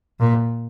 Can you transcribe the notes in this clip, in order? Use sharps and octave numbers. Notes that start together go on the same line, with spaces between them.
A#2